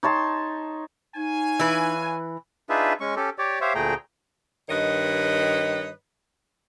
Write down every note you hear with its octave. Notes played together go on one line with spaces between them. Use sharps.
D#4 C#5 A5 C6
D#4 C#5 F5 G#5
E3 B4
D4 D#4 F4 G#4 B4 E5
G#3 C#4 C#6
C#4 G4 A4
G4 C#5 D5
G4 C5 C#5 E5 F5
D2 A#2 A3 G#4 G5 A#5
G2 D#3 B4 C#5 D#5